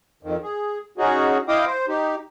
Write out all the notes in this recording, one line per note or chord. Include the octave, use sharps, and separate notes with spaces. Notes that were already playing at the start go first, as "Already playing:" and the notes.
F2 D#3
G#4
C#4 D#4 F#4 G#4
E4 D#5 F5 G5 D6 D#6
C5
D#4 G4